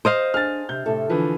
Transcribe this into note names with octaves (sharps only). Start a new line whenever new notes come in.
C5 D#5 F5
D4 G#4 F6 A6
C3 G6
A2 C3 A4
D3 E3 F3 G#4